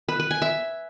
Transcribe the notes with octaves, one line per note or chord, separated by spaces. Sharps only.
B4
B4
G#5
E5